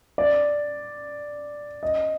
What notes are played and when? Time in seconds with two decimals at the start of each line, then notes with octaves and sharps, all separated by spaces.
0.18 D5
1.83 D#5